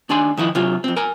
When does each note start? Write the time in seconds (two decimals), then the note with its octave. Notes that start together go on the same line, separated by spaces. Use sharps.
0.09 D#2 D4 D5 G#5 C6
0.37 D#3 F3 E4 D#5
0.55 C3 F#3 F4
0.84 F2 C4
0.96 A#4 G#5 A#5